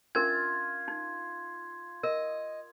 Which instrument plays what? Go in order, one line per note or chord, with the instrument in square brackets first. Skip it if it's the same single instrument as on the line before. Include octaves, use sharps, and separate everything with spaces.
[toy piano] C#4 D4 A#4 [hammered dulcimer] F4 [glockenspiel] G#6
[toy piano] D#4
[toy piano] A#4 [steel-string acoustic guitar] D#5